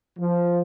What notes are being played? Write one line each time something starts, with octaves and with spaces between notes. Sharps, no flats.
F3